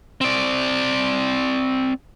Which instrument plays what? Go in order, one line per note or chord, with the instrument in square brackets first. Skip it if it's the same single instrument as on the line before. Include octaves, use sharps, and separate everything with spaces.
[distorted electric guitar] C4 D5